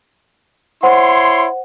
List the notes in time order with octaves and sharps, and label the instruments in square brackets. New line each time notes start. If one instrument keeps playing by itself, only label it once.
[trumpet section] E4 C#5 C6 [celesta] C5 F#5